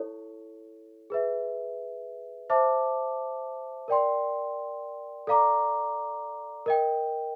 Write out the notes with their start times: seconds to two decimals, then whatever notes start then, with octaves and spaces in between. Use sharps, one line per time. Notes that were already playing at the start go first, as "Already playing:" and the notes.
Already playing: E4 A4 C#5
1.10 G#4 B4 E5
2.50 C5 E5 A5 D6
3.88 A#4 D5 G5 C6
5.27 A4 D5 F5 A#5 D6
6.66 A#4 D#5 G5